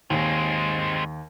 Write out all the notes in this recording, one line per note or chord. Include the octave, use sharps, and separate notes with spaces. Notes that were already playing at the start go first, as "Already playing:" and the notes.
D#2 G#3 C4